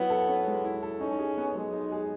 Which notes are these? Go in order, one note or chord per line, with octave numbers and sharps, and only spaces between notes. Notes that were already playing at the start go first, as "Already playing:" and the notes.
Already playing: F#3 B3 E4
A4
C#4
G#3
E4
A4
C#4 D#4
G#4
B3
F#3 G#3
D#4
G#4